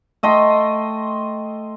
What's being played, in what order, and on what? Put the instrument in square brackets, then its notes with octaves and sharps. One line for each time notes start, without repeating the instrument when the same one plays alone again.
[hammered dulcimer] A3 D#5 G5 C6